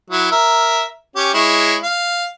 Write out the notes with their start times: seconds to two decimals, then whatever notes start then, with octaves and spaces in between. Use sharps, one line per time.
0.10 F#3 E4
0.31 A#4 E5
1.16 C#4 G4
1.34 G#3 E4 C#5
1.83 F5